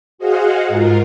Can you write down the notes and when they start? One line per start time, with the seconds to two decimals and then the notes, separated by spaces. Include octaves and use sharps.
0.18 F#4 G#4 C5 D#5 F5 F#5
0.68 G#2 F4 A#4